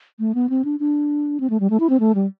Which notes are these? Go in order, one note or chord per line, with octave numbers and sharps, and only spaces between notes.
A3
B3
C4
D4
D4
C4
A3
G3
A3
E4
C4
A3
G3